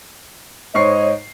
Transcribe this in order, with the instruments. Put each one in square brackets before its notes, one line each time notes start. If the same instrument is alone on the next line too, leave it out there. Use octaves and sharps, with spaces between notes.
[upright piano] G#2 C#6 C7 [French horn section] C5 C#5 D#5